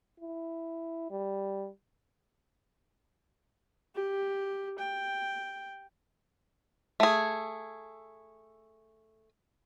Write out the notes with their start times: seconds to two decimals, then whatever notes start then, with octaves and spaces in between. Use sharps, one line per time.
0.20 E4
1.11 G3
3.95 G4
4.79 G5
7.00 A3 G#4